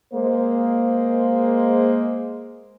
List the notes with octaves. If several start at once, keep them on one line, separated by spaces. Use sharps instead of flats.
G#3 A#3 C5